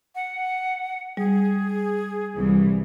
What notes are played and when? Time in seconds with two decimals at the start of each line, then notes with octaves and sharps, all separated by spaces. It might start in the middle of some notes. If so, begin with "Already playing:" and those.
0.15 F#5
1.17 G3 G#4
2.36 C2 E3